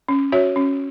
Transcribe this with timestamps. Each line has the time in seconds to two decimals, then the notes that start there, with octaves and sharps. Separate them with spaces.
0.09 C#4
0.32 F#4 C#5 E5
0.56 C#4